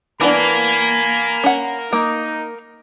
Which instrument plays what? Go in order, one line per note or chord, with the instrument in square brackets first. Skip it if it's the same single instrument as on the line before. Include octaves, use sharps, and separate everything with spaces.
[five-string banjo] E3 B3 D4 [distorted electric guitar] A#4 F5 [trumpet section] G#5 B5
[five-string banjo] C#4 F#5
[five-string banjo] A#3 [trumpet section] D#4